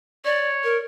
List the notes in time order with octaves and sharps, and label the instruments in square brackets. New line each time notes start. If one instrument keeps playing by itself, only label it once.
[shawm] C#5 [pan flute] D5
[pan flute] A#4